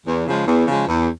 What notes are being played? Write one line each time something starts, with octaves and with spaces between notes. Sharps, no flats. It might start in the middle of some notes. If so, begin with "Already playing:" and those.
E2
C#3 F3 G#3
E2
C#3 F3 G#3
E2